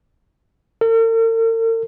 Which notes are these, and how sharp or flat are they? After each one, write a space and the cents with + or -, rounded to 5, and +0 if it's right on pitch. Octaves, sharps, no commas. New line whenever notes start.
A#4 -45